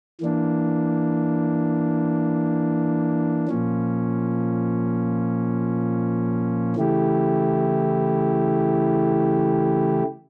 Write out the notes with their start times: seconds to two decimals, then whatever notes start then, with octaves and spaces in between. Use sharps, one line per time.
0.21 E3 A#3 D4
3.47 A#2 F3 A#3 C#4
6.76 C#3 E3 A3 E4 G4